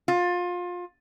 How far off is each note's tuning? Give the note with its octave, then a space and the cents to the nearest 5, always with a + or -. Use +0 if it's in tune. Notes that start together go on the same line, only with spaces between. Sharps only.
F4 +25